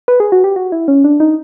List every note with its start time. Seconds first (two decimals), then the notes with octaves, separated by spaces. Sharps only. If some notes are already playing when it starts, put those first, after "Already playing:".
0.08 B4
0.20 G#4
0.32 F#4
0.44 G4
0.56 F#4
0.72 E4
0.88 C#4
1.04 D4
1.20 D#4